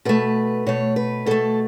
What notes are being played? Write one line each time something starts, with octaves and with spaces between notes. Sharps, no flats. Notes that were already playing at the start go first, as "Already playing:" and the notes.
B2 A3 B4
B2 A3 C#5
B4
B2 A3 A4